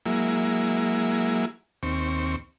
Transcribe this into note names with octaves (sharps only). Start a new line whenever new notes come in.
F#3 G#3 A#3 E4
D#2 C4 C#6